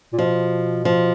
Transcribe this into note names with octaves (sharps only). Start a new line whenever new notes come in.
A#2
B2 F3
F3